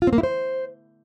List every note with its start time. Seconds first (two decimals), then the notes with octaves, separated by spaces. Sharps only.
0.02 F4
0.07 C4
0.13 A#3
0.18 E4
0.23 C5